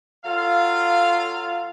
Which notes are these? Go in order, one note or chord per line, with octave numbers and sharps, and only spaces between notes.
F#3 F4 A4 F5